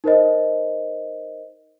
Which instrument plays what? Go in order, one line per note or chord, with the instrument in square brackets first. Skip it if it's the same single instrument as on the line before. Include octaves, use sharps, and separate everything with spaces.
[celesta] D#4 A#4 C5 D#5